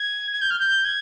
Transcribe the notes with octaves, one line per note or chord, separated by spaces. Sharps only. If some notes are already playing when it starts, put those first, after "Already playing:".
Already playing: G#6
G#6
G6
F6
G6
G#6